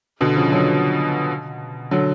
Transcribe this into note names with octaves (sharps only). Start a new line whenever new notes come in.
B2 D3
C#3 F3
D3 F#3
D3 F#3